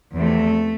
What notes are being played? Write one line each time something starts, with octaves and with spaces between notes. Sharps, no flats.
E2 C3 F3 A3